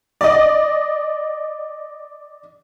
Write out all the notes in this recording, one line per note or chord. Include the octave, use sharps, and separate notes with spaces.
D5 D#5